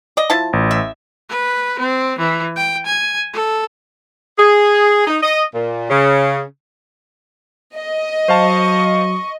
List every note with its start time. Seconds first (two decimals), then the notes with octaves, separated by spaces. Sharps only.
0.17 D5 D#5
0.30 F3 E4 A5
0.53 A1
0.71 E5
1.29 B4
1.79 C4
2.19 E3
2.56 G5
2.86 G#5
3.33 A4
4.38 G#4
5.07 D#4
5.23 D#5
5.54 A#2
5.89 C#3
7.77 D#5
8.28 F#3 C5 F5 A5 C#6